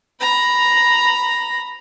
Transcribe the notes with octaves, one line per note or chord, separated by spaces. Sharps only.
A#5 B5